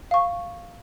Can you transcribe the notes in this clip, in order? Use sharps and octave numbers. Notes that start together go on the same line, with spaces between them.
F5 C#6